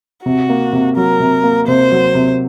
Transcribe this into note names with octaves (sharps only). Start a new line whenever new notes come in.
C3 F#4
A#3
C3
F#3 A#4
C3
A#3
C3 C5
F#3
C3